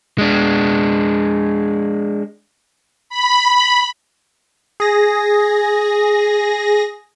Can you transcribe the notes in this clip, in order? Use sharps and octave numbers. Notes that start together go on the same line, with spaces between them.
G#3 D4
B5
G#4 A#6